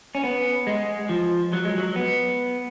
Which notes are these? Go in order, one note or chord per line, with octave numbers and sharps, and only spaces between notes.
C#4
B3
G#3
F3
F#3
G#3
F#3
B3